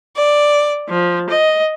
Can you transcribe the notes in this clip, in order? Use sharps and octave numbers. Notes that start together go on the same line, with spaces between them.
D5
F3
D#5